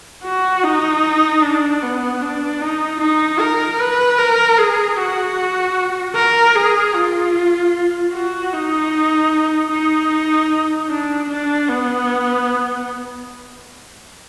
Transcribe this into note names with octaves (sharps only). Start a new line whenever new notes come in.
F#4
D#4
D4
B3
D4
D#4
D#4
A#4
B4
A#4
G#4
F#4
A#4
G#4
F4
F#4
D#4
D#4
D4
D4
B3